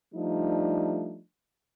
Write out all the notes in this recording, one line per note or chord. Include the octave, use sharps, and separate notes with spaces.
F3 G3 A3 D4 D#4